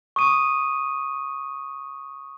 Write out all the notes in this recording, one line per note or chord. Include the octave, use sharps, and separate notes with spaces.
C#6 D#6 D#7